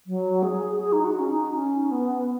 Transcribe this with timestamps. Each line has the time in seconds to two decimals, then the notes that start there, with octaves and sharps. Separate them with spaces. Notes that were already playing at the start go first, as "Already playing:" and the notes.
0.07 F#3
0.43 G#4
0.80 G#4
0.93 D#4
1.05 F#4
1.19 C#4
1.30 D#4
1.54 C#4
1.91 B3